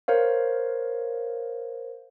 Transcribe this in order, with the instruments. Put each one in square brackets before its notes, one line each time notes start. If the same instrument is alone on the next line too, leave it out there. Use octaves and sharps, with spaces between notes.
[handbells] A#4 C5 C#5 F5